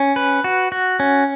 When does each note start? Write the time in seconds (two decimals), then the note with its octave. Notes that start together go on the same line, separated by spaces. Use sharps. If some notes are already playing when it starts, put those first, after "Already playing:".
Already playing: C#4
0.16 B4
0.44 F#4
0.72 F#4
1.00 C#4